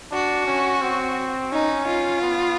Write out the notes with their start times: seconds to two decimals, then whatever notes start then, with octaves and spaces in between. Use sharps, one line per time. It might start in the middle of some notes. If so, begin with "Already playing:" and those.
0.12 D4 F#4
0.47 C#4
0.81 C4
1.52 C#4 D#4
1.87 F4
2.22 B3